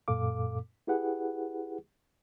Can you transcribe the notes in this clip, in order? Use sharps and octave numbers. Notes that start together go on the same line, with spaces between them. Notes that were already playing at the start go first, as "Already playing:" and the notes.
F#2 A#2 A4 F5 D6
E4 G4 G#4 B4 F#5